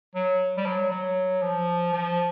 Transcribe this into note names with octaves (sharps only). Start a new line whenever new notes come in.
F#3
G3
F#3
F#3
F3
F3